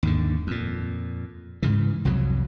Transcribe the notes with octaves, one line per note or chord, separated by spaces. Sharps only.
D#2 G#2 D3
F2 A#2
G#2 C#3 E3
C2 F2 B2 F#3